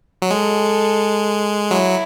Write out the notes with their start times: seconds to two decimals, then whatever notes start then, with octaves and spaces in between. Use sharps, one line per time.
0.22 F#3
0.31 G#3 A4
1.71 F#3 E4